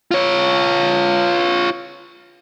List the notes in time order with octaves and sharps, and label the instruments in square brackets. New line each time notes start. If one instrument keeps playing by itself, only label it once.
[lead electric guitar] F4 C#5